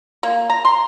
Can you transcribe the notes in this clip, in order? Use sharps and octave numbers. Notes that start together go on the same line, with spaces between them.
A#3
A#5
C6